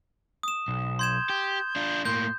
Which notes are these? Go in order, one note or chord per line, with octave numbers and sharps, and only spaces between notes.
D#6 E7
B1
C6 G6 G#6 E7
G4
D4 F4
A2 A#3 C6 G6